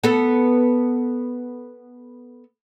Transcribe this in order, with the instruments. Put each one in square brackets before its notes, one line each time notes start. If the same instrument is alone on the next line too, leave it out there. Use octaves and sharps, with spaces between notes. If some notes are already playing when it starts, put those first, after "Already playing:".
[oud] B3 A4